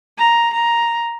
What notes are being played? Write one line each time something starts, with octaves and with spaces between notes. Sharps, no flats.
A#5
A#5